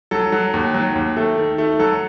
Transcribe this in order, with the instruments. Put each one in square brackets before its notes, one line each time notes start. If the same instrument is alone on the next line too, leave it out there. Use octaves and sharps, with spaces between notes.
[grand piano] F#3 A4
F#3
D#2
F#3
D#2
A3
D#3
A3
F#3 A4